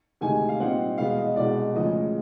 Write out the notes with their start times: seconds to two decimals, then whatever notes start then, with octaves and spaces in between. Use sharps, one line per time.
0.21 D2 C3 D#3 G#3 G#5
0.49 F5
0.60 A#2 G3 C4 D#4 F#5
0.98 E2 B2 G#3 B3 F5
1.18 D#5
1.36 C2 B2 G#3 D5
1.75 D2 C#3 F3 G#3 D#5